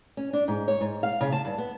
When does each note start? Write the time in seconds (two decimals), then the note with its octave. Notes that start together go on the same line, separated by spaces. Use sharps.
0.17 C#4
0.33 D4
0.48 G#2
0.68 C#5
0.81 G#2
1.03 F5
1.21 C#3
1.32 A5
1.45 G2
1.58 B3